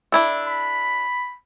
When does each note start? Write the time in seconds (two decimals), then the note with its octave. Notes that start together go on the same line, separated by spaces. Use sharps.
0.12 D4 E4 A4
0.47 B5